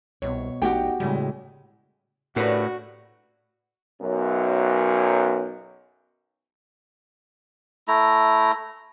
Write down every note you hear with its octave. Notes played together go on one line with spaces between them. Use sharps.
C2 B2 C#5
A#1 D#4 F#4 G4 G5
A2 C#3 G3 G#3
A2 C#3 D4 F#4 G4 A#4 B4
B1 F#2
A3 E4 A#5